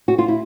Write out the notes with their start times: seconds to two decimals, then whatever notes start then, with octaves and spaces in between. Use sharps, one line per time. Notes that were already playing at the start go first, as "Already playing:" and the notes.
0.08 F#4
0.18 F4
0.28 E4